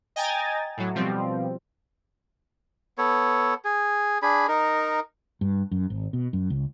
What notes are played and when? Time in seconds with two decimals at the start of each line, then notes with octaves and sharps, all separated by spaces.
0.16 D#5 G5 G#5 A#5 A6
0.77 A2 F#3
0.95 B2 F3 G3 C4
2.98 B3 A4 C#5
3.65 G#4
4.22 D4 G#4 B5
4.48 D#4 A#4
5.41 G2
5.71 F#2
5.90 G#1
6.13 B2
6.33 F#2
6.50 C#2